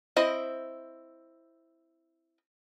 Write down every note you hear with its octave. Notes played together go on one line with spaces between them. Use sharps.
C4 E4 D#5